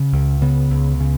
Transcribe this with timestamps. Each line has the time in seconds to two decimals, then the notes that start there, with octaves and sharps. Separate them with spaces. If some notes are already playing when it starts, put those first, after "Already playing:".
Already playing: C#3 C#4
0.12 C#2
0.41 C#3 B3
0.70 C#2
1.00 C#3